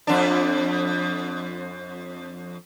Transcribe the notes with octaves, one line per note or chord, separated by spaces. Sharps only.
F2 D4